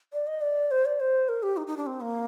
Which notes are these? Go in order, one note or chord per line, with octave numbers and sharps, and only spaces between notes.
D5
D#5
D5
C5
D5
C5
A#4
G4
D#4
D#4
D4
C4
A#3